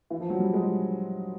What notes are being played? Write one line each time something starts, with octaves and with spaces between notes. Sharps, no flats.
E3
F3
F#3
G3
G#3